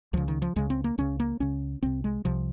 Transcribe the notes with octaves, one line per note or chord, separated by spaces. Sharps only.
C#2 C#3 F3
D#3
F3
C#2 C#3 G#3
C4
A#3
C#2 C#3 C#4
A#3
C#2 C#3 C#4
C2 C3 C4
G#3
C2 C3 F3